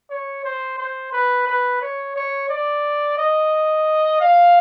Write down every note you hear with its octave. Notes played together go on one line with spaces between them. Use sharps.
C#5
C5
C5
B4
B4
C#5
C#5
D5
D#5
F5